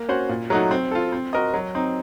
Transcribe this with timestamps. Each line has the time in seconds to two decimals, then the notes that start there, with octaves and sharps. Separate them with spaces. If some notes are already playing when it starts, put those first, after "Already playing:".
Already playing: A#3
0.09 C#4 F#4 C5
0.29 A#2
0.50 F#3 A3 D#4 F#4
0.71 C4
0.91 F4 A4
1.12 C4
1.33 F#4 A#4 D#5
1.54 F#3
1.75 C4 D#4